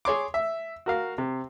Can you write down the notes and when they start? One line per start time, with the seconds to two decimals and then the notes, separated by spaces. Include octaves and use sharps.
0.05 G#4 C#5 C6 D6
0.34 E5
0.86 F#4 A#4 F5
1.18 C3